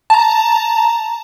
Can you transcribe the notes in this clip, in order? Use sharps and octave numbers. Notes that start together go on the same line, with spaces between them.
A5 A#5